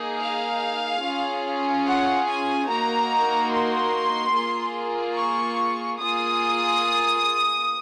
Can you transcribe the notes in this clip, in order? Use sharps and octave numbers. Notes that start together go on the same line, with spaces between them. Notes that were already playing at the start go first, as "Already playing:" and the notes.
Already playing: A#3 D#4 G#4
F5
C#4 F4 G#4
F#5
G#5
A#3 D#4 F#4 A#5
C6
A#3 F4 G#4
C#6
A#3 F4 G#4 D#6